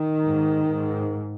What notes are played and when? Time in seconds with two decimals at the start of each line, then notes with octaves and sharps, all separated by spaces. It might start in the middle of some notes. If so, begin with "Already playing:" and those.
Already playing: D#3
0.22 G#2
0.69 G#2